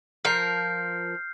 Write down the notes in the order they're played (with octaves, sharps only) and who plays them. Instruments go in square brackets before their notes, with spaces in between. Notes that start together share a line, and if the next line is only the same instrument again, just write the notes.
[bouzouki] F3 A#4 [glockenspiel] F6 G6 C7